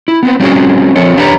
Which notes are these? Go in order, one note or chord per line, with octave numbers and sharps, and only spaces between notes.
E4
B3 C4 B4
G3 C4 C#4 F#4 G#4
F3 C4 A4 C#5
E2 D4 G4 B4 C#5 A#5